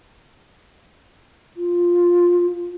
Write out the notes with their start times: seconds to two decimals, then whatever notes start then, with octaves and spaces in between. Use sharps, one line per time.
1.57 F4